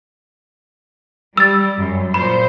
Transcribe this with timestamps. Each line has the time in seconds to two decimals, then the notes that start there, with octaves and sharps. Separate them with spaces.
1.37 G3 E6 A6
1.78 F#2
2.14 A#2 C5 B5